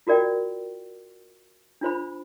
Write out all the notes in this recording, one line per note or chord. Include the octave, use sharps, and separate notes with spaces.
F4 F#4 A#4 D5 G5
D4 F4 C5 B5